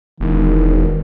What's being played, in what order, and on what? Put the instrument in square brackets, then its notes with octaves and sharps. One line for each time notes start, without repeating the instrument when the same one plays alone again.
[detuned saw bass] E1 [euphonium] D#3